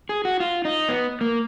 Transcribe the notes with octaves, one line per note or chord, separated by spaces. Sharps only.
G#4
F#4
F4
D#4
B3
A#3